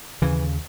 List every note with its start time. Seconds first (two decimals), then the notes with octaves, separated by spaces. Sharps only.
0.22 D#2 C#3 E3